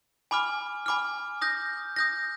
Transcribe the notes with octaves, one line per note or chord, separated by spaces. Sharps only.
G#5 B5 D6 F6
G#5 B5 D6 F6
D#6 G6 A#6
D#6 G6 A#6